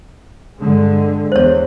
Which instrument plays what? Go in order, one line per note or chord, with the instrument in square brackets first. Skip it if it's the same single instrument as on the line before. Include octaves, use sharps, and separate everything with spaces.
[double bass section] G2 D3 G#3
[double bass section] E2 [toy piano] C5 C#5